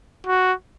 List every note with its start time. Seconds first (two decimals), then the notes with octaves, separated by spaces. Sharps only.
0.27 F#4